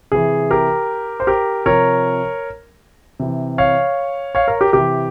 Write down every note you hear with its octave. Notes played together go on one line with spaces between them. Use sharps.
C3 E3 G#4
G4 A#4
C5
G4 A#4
C3 F3 A#4 C#5
C3 E3
C#5 F5
C#5 F5
A#4 C#5
G4 A#4
C3 E3 G4